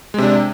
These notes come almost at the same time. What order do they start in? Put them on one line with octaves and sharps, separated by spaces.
G#3 C3 D4